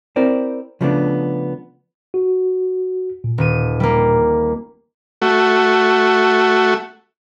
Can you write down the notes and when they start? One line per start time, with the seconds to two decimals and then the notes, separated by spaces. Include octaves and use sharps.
0.16 C4 E4 A#4 C5 D5
0.81 C#3 F3 G3 A3 B3 D4
2.14 F#4
3.24 A#2
3.38 D#1 D#7
3.80 G3 A#3
5.22 A3 F#4